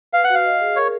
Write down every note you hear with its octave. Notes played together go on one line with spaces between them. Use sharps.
B4 F5
F#5
F#4 F5
D#5
G#4
A#4 C#5